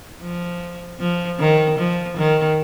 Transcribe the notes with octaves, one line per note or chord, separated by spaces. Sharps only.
F3
F3
D#3
F3
D#3